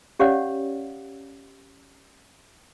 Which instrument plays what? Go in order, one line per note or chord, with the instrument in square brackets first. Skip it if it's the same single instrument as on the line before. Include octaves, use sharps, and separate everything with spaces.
[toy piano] C#4 G4 C#5 D5 F5 F#5